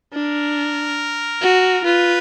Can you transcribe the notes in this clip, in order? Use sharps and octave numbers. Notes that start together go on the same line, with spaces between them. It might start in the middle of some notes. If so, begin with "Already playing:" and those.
D4 A#4
F#4
F4 B4